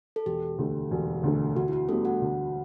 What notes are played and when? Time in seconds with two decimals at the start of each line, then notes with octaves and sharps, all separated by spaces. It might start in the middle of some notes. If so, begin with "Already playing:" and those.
0.16 A4
0.26 E1 G4
0.58 D2 D3 A3
0.91 E1
1.23 D2 D3 A3
1.56 D2 F#4
1.68 E4
1.73 F#4
1.88 D3 G3 A3 B3 A4
2.05 F#4 F#5
2.21 D2